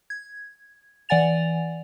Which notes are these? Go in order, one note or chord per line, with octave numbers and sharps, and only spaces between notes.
G#6
E3 D5 F#5 G#5 A6 F7